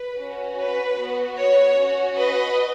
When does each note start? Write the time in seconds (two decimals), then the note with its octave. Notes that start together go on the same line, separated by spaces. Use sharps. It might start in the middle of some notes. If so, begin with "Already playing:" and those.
Already playing: B4
0.19 C#4 F#4
0.59 B4
0.99 B3 F#4
1.39 C#5
1.78 C#4 F#4
2.18 B4 D#5